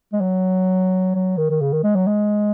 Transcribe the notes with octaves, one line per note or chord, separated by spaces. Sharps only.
G#3
F#3
F#3
D#3
D#3
C#3
D#3
G#3
F#3
G#3